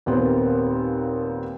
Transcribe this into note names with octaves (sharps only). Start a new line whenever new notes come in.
D#2 A#2 B3 C4